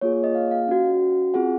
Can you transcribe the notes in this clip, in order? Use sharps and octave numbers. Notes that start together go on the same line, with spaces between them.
A#3 F4 G#4 C#5
C#5
D#5
F5
F5
C#4 F#4
C4 F4 G#4 F#5